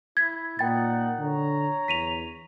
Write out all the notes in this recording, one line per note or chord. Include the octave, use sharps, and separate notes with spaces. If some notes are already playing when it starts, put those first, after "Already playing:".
E4 G#6 B6
A#2 D#4 F#5 G5 A6
D3 C#5 A#5
E2 B6 D#7 F7